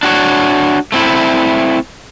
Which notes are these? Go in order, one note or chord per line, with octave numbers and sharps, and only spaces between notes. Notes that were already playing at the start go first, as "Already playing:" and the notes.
D4 F#4 C#5
A3 C4 E4